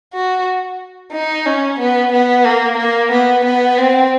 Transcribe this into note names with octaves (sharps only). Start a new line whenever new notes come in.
F#4
D#4
C#4
B3
B3
A#3
A#3
B3
B3
C4